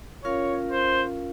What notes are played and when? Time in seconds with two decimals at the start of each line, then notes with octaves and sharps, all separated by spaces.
0.24 C#4 F4 A#4 C#5 F5
0.72 C5